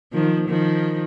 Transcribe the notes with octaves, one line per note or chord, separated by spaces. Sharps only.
D#3 F3
D#3 F3